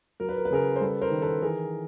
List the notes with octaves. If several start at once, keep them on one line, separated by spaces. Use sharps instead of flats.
F#3 A#4
B4
A#4
B4
C#3 G#4 A#4
C5
G3 A4 B4
A#4 C5
D#3
A4 B4
E3 G#4 A#4